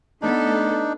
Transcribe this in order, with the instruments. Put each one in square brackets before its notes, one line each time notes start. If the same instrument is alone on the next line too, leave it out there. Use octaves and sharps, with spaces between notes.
[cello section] A3 B3 A4 [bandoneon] D4 D#4